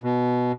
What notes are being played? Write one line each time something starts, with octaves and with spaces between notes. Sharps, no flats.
B2